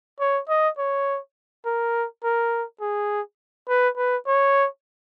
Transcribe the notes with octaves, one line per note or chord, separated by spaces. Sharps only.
C#5
D#5
C#5
A#4
A#4
G#4
B4
B4
C#5